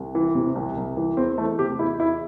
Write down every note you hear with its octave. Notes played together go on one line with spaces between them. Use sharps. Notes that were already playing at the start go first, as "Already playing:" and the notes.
Already playing: C2
E3
C3
C2
C2
E3
E2 C4
E3 A3
C3 G4
E2 E4
E2 E4